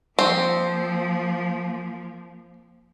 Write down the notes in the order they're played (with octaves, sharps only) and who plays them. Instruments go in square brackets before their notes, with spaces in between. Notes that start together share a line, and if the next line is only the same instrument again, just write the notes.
[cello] F3 A#3 [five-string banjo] C4